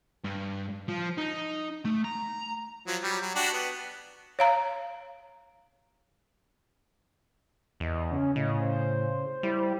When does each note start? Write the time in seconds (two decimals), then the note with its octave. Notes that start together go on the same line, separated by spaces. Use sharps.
0.24 G2
0.89 F3
1.18 D#4
1.85 A3
2.04 A#5
2.87 F3 F#3
3.03 F#3 G3
3.21 F#3
3.35 D4 F#4 G4
3.53 B3
4.39 C#5 F5 A#5
7.80 E2 D#5
8.11 C#3 C#4
8.36 A2 C#3 D#5
8.59 C5
9.43 G3 E4